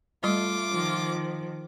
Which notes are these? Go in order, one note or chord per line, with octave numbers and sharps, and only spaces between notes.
G3 A3 F4 D6
D#3 F3